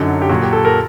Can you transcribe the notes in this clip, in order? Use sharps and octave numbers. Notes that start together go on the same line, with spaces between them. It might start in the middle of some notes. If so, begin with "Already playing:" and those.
Already playing: F#2 D3 F#3 D#4
G4
A#2 F#3 F#4
G4
A4
A#4